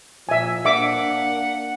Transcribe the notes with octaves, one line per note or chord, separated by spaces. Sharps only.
A#2 F3 E5 G#5
A#3 D4 E5 F#5 D6